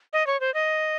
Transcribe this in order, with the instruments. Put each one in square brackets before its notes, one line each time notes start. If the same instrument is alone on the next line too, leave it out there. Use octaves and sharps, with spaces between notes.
[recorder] D#5
C#5
C5
D#5